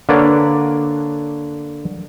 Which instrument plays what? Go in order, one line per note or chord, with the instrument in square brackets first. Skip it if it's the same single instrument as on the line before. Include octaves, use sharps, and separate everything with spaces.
[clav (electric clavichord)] D3 A#3 D4 B4 C#5 D5